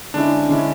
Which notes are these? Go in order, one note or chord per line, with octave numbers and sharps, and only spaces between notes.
D3 G#3 C#4 D4 E4
D3 G#3 C#4 E4